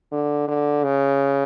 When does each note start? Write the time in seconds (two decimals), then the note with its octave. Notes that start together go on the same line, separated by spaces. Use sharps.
0.12 D3
0.48 D3
0.84 C#3